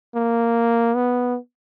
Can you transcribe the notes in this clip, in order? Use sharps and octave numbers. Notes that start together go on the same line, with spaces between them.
A#3
B3